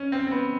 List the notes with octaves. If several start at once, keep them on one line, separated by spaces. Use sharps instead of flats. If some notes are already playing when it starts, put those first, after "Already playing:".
Already playing: C#4
C4
C4
B3